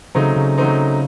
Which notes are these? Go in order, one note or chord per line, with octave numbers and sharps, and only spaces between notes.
C#3 F#3 A3 C4 D#4
C#3
F#3 A3 C4 D#4